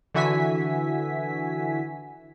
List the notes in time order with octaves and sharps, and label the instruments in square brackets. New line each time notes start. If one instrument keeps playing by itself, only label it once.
[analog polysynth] D3 E3 F#4 E5 G#5 B6